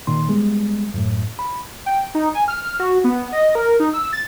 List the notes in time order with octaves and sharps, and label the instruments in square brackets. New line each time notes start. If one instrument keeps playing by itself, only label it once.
[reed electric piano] A#2 D#3 C6
G3 G#3 B3
F#2 A2
B5
[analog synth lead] G5
D#4
G#5
F6
F#4
B3
D#5
A#4
D#4
E6
A6